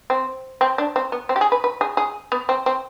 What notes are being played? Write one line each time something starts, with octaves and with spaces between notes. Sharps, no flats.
C4
C4
D4
C4
B3
C4
G4
G#4
B4
B4
G#4
G#4
B3
C4
C4